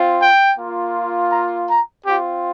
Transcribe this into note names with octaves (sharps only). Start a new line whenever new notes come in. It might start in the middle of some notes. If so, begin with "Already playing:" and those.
Already playing: C4 F4
G5
A#3 F4
A#5
A#5
C4 F4 G4